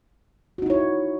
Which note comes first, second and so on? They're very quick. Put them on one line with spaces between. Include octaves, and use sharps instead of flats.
F#4 D#4 E4 C#5